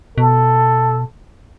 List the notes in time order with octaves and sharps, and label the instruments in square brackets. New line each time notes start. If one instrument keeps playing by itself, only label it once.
[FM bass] B2 [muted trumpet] A4